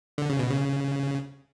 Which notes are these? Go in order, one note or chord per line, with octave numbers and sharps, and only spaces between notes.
D3
C#3
B2
C#3